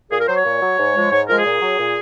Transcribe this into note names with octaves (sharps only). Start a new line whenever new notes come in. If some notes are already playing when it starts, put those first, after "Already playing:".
A#2 G#4
A#4
F#3 C5
C#5
A#2
F#3
G#2
F3 G#3
G#2 C#5
F3 G#3 A#4
G#4
A#2
F#3
A#2